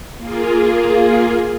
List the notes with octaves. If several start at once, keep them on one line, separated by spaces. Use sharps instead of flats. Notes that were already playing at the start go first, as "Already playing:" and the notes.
A#3 F4 G#4